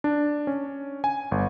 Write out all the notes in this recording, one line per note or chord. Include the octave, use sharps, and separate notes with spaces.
D4
C#4
G#5
G1